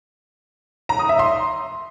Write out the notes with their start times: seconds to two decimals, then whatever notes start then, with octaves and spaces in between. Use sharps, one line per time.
0.89 A#5
0.99 D#6
1.09 E5
1.19 C6